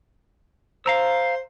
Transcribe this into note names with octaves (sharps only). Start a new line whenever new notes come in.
C5 F5 A#5 E6